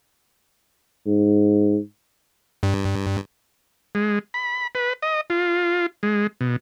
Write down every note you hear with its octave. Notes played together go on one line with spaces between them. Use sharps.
G#2
G2
G#3
B5
B4
D#5
F4
G#3
B2